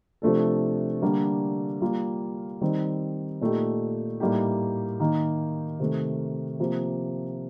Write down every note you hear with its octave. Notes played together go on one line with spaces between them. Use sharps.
C3 F3 A3 D4 A4
D3 G3 A#3 D4
G3 A#3 F4
D#3 G3 C4 D#4
A#2 A3 D#4 G4
A2 G3 A#3 D#4 G4
D#3 A#3 D#4
C3 D#3 A3
C3 F3 A#3